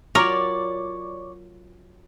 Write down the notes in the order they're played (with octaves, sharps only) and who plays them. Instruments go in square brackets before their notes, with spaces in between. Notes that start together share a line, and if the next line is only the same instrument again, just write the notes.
[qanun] F#3 F4 [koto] A#4 [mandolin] C#5 D5